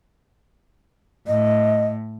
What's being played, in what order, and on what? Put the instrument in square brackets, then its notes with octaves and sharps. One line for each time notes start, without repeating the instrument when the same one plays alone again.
[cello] A2 [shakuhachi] D#5